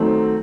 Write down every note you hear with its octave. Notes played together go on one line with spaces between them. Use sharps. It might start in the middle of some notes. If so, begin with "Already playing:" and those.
Already playing: D#3 F#3 A3 C4 D#4